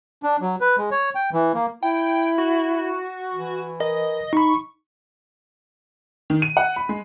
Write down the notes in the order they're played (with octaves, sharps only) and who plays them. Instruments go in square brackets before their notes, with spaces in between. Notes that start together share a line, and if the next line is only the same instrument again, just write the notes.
[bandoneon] D4
F#3
B4
G#3
C#5
G5
E3
A#3
[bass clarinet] E4 [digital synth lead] G5
[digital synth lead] F#4
[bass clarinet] E3
[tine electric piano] A#4 [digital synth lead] D#5
[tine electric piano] D#4 B5 [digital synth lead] C#6
[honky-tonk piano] D#3
D#7
F#5
B5
G#3